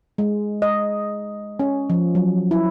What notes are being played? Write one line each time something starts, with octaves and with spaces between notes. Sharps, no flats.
G#3
D#5
C#4
F3
F#3
E4